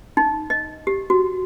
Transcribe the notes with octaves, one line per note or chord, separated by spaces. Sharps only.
D#4
D#5
G4
F#4